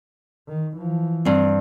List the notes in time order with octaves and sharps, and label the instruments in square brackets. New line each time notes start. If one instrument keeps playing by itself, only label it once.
[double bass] D#3
E3 F3
[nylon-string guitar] G2 C4